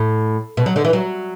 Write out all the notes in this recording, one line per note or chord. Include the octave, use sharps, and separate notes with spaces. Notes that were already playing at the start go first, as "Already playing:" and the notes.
Already playing: A2
B2
F#3
D3
E3
F#3